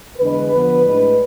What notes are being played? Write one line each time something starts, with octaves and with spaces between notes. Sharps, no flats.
E2 D3 G#3 D4 B4
D3 F3 B3
A2 G#3 D4